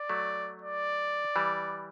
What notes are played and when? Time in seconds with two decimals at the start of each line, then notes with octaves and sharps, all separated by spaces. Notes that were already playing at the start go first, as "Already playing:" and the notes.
Already playing: D5
0.09 F#3 A3
0.62 D5
1.36 E3 G3